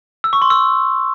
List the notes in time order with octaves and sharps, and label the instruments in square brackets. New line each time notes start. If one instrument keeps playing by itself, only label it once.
[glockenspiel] E6
C#6
C6
E6